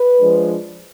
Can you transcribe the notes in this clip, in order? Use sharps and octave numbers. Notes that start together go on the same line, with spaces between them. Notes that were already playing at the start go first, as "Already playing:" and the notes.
Already playing: B4
F3 G#3 D4